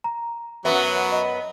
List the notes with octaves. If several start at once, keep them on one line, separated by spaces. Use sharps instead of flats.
A#5
F#2 F#3 B3 B4 E5
D#5